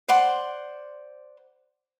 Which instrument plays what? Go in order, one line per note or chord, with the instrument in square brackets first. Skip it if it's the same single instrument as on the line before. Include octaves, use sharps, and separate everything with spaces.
[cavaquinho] C5 D5 F#5 C6